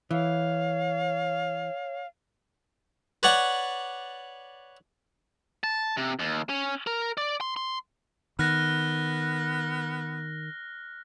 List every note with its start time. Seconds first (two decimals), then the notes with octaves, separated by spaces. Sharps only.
0.11 E3 C#5 F5
3.23 B4 C#5 D5 F#5
5.64 A5
5.97 C3
6.19 D#2
6.49 C#4
6.87 A#4
7.18 D5
7.41 C6
7.57 C6
8.39 D#3 B3 F6 F#6 A#6